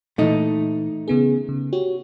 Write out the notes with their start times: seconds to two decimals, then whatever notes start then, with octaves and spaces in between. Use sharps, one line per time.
0.18 A#2 E3 A3 D#4
1.08 C#3 B3 G#4
1.49 C#3
1.73 F#4 G4 C#5